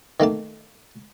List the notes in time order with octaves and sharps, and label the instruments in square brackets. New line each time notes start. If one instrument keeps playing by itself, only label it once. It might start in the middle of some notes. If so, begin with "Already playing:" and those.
[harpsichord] D#3 A3 A#3 A5